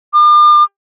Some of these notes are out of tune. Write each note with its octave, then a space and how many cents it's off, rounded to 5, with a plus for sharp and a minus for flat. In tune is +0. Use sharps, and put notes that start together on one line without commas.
D6 +40